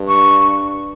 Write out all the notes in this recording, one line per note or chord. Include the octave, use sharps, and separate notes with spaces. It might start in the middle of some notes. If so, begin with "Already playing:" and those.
Already playing: G2
C#6